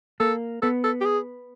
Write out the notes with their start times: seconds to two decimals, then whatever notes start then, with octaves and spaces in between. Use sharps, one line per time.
0.20 A#3 A4
0.63 B3 A4
0.84 A4
1.01 G4
1.05 G#4